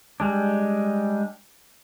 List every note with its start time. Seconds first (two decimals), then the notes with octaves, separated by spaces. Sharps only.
0.20 G3 G#3 D4